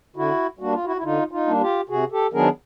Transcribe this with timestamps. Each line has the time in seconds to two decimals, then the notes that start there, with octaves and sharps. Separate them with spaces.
0.16 D3 E4 F#4
0.59 G3 A#3 D4 F#4
0.72 F4
0.85 E4 F#4
0.96 E4
1.03 D3 D#4 F4
1.31 D#4 F4
1.47 G3 A#3 D4
1.61 F4 G4
1.89 C3 F#4 G#4
2.12 G4 A4
2.33 D#3 F#3 B3 D4 G#4 A#4